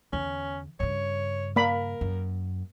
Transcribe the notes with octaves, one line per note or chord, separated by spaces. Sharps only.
E2 D3 C#4
G2 C#3 C#5
A#3 A#4 B5
F#2